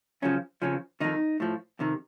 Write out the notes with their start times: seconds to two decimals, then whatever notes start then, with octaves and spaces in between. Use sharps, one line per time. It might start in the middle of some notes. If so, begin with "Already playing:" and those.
0.22 F#2 C#3 F3 C#4
0.62 F2 C#3 F3 C#4
1.00 F2 D#3 D#4
1.40 A2 F3
1.79 F2 C3 D#3